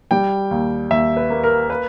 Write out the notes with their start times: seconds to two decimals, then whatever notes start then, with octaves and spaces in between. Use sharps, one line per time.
0.11 G3 G5
0.51 D#2
0.90 D#2 E5
1.17 B4
1.30 A#3
1.43 A#4
1.70 B4